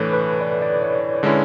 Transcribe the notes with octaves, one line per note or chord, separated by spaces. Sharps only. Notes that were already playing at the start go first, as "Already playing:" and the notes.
Already playing: A2 E3 A3 D4 A4 B4 C#5
B4
D5
D5
C#5
D3 G#3 C#4 E4